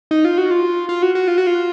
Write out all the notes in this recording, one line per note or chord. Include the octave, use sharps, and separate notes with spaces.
D#4
F4
F#4
F4
F4
F#4
F#4
F4
F#4
F4